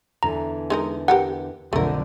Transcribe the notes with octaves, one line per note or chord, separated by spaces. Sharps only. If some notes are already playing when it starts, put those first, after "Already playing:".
E2 D3 E3 A#5
G#3 D#4 A#4
G4 A#4 B4 F#5
B1 F2 D3 A3 A#4